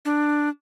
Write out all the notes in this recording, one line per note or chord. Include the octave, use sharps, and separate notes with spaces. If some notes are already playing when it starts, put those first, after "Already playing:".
D4